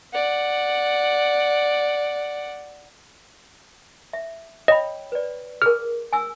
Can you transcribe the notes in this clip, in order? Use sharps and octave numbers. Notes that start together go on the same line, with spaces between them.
D5 F#5
E5
C#5 D#5 G5 B5
B4 D5
G#4 A#4 F6
G#5 E6